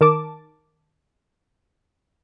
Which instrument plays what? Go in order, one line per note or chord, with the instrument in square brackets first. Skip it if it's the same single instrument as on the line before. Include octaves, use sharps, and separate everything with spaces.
[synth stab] D#3 A#4 A5 D6